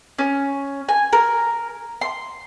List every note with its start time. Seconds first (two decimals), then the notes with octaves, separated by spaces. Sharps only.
0.19 C#4
0.89 G#5
1.13 A#4
2.01 C6